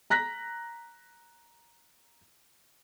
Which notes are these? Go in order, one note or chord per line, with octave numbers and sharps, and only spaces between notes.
A#5 F#6 A#6 B6